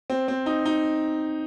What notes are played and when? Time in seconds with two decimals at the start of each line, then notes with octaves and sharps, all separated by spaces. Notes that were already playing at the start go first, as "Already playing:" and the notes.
0.10 C4
0.28 C4
0.46 D#4
0.65 D#4